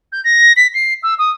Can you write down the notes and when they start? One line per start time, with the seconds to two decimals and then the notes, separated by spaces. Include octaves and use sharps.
0.12 G6
0.24 A#6
0.56 B6
0.74 C7
1.03 E6
1.18 D#6